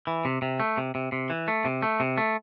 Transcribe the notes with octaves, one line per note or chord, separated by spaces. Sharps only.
E3
C3
C3
A3
C3
C3
C3
E3
A3
C3
A3
C3
A3